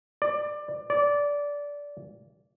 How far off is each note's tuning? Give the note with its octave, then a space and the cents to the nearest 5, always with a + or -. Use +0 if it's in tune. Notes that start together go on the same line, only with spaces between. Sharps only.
D5 +20
D5 -15